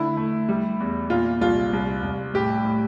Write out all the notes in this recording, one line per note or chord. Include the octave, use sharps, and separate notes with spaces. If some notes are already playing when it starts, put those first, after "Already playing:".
Already playing: D3 A3 E4
A3
G3
E2
A#2 F4
C2 F4
C2
C2
A2 G4
A2